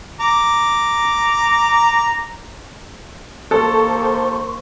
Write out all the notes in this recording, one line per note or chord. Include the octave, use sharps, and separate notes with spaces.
A#5 D6
A#3 A4 C5 C6 C#6